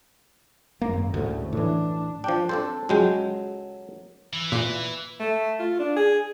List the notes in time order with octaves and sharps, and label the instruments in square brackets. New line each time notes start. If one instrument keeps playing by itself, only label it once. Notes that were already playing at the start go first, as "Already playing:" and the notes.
[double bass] G#1 F#2 [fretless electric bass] A#3
[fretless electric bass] D2 [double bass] A2 C#3
[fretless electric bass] A2 E3 [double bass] D4
[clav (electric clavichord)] F3 D4 [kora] G5
[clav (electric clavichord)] C4 D4 C5 [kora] A4
[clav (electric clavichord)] C#2 G#3 G5 [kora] F#3
[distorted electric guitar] E3
[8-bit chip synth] A#2
[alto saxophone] A3
F4
D4
G#4